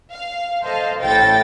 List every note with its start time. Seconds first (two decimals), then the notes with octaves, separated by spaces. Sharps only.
0.14 F5
0.63 A4 C5 D#5 F5
1.02 A1 A2 A4 G5 A6